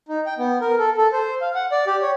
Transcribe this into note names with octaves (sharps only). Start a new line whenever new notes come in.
D#4
G5
B3
A#4
A4
A4
C5
F5
F#5
D5
G4
C#5